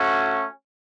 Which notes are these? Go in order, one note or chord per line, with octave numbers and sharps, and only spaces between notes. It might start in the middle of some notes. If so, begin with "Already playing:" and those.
Already playing: A3 C#4 F#4